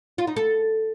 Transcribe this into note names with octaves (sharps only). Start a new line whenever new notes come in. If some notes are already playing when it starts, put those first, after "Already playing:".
F4
D#4
A4